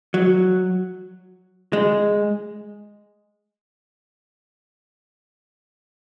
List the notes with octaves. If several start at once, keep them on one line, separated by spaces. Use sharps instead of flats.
F#3
G#3